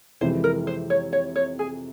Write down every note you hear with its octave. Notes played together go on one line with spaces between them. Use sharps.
F2 C3 E3 G#3 C5
A#4
C5
C#5
C#5
C#5
G#4